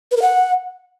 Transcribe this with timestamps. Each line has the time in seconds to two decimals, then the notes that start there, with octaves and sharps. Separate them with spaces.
0.11 B4
0.17 A#4
0.22 F#5